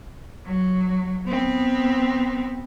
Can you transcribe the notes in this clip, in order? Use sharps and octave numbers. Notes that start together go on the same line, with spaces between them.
F#3
B3 C4